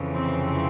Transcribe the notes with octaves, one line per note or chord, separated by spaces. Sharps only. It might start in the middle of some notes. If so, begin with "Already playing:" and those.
Already playing: F2 C#3 E3
C3 C4